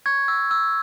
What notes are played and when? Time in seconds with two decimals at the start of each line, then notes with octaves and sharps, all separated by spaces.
0.06 C#6 G#6
0.28 E6
0.51 E6